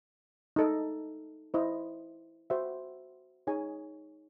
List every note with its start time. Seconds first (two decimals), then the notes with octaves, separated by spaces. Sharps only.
0.56 D#4 A4 D#5
1.54 E4 C5 D#5
2.50 F#4 C5 E5
3.47 D#4 G#4 C#5 G#5